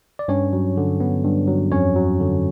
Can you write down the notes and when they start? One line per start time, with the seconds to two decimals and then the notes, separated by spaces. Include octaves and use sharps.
0.19 D5
0.28 G2 C#4 C#5
0.53 F#3
0.77 D3
1.00 B3
1.25 G2
1.48 F#3
1.72 F2 C#4 C#5
1.96 F#3
2.20 D3